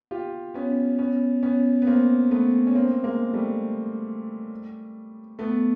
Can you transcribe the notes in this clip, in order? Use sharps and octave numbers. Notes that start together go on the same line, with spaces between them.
F4 G4
B3 C#4
B3 C#4
B3 C#4
B3
A#3 C4
A3 B3
C#4
A#3 C4
G#3 A#3
G3 A3
A3 B3